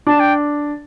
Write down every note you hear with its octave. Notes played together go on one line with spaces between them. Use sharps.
D4 A5
G5